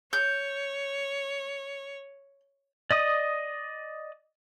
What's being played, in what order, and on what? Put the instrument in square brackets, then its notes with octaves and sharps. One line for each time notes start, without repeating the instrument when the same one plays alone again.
[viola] C#5 [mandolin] G6
[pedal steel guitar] D5 D#5 D#6